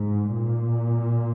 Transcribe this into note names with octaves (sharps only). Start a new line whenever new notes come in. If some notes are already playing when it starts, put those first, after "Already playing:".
Already playing: G#2
A#2